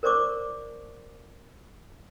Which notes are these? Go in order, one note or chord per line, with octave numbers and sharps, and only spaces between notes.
A#4 C5 D5 C#6 D6